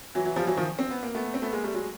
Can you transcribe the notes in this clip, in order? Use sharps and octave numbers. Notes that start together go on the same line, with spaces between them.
E3 F#3
E3 F#3
F3 G3
E3 F#3
D#3 F3
C4
B3
A#3
A3 B3
C4
A3 B3
G#3 A#3
G3 A3
F#3 G#3